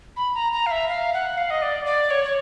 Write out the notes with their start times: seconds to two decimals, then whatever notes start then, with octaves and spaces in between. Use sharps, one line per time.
0.17 B5
0.35 A#5
0.53 A#5
0.66 F5
0.71 E5
0.89 F5
1.13 F#5
1.37 F5
1.50 D#5
1.62 D5
1.85 D5
2.10 C#5
2.24 C#5